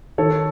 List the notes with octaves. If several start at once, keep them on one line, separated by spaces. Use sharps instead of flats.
D#3 A4 C#5